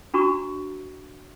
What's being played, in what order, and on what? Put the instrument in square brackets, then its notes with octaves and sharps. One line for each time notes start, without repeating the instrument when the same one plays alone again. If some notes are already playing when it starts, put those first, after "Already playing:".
[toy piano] D4 F#4 A#5 C#6